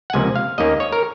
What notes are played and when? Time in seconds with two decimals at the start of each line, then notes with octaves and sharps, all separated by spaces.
0.10 F#5
0.13 C#2 C3 F3 A#3 G#5
0.36 F5
0.58 D#2 D#3 A#3 C#4 D#5
0.80 C#5
0.92 A#4